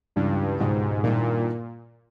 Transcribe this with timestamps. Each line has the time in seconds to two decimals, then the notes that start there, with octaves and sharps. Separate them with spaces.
0.16 C#2 G2 C#3 E3
0.60 C#2 G#2 B2 G#3 D#4 G4
1.03 G2 A#2 D#3 A#3 E4